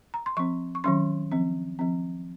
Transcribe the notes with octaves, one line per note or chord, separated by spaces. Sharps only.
A#5
C6
F3 C4 C#6
C#6
D#3 F#3 C#4 C6
F3 C4
F3 C4